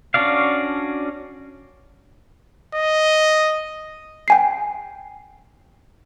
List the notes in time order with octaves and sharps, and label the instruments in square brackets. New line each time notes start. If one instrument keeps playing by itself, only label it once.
[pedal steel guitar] C#4 D4 F#4 D5 F5
[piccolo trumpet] D#5
[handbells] G5 G#5 C7